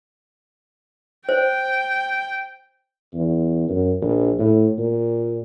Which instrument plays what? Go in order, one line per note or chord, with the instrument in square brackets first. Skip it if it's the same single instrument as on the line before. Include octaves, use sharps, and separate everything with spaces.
[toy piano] C5 [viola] G5
[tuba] E2
F#2
A#1
A2
A#2